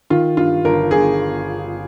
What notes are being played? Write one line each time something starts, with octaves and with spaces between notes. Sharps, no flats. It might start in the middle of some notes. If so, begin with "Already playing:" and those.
D#3 F4
G2 F4
G1 A#4
G1 G#4